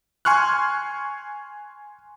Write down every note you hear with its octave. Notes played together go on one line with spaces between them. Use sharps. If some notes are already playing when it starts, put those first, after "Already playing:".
G#5 C6 C#6 F6 F#6